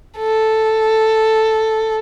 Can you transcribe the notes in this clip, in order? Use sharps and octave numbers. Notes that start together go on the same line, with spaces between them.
A4